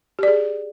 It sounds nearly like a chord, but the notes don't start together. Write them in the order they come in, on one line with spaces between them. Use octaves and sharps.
G4 D5 G#4